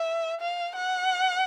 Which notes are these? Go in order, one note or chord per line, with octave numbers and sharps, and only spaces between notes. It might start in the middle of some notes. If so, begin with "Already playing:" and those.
Already playing: E5
F5
F#5